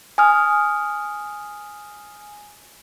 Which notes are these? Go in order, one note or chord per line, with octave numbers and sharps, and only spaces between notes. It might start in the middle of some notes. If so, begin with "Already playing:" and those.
G#5 D#6 F6